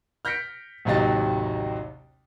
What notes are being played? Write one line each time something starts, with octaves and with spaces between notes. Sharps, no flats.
F6 G6 A#6 B6 C#7 D7
A1 D#2 C3 F#3 D#5 A6